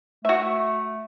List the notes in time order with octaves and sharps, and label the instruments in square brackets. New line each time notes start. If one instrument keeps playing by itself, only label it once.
[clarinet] A3 [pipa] F#4 E5